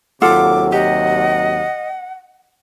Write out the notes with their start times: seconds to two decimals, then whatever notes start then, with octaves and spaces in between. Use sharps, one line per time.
0.22 D#2 C3 F#3 F4 A4 F#5 D6
0.72 G4 D#5 F#5